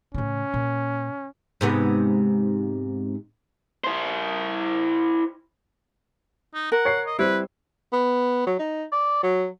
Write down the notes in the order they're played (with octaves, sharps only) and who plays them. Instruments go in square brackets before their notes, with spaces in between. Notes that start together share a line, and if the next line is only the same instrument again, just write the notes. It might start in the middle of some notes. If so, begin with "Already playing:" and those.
[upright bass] A2 C#3 [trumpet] C#4
[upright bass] A#2
[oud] G#2 C3 B3
[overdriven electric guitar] E4 C5
[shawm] D#4
[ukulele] A#4 [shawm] F#5
[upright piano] C#5 C7
[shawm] D#5
[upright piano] G3 C4 [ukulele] E4 [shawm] B4
[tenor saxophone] B3
F#3
D#4
D5
F#3